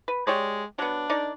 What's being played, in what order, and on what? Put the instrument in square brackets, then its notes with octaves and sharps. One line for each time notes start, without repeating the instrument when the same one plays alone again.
[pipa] B4
[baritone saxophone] G#3 [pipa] G4 C#5 D5
[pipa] F#3 B3 [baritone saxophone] D4
[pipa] D#4 A#4 D5